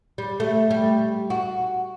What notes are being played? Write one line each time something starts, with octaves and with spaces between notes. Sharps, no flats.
G3
A3
G3
F#4